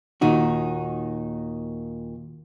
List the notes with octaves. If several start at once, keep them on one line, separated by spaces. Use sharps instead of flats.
D#2 A#2 D#3 D#4 F#4